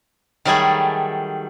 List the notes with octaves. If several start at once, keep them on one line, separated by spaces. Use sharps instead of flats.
D#3 F#3 G3 A3 G#4